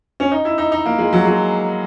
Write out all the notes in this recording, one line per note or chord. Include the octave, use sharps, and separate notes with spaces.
C#4
D#4
E4
D#4
D#4
A#3
G#3
F#3
G#3